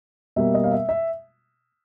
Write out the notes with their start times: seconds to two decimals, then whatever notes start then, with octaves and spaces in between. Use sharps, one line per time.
0.36 B2 G3 A#3 E5
0.54 D#5
0.64 F5
0.71 E5
0.89 E5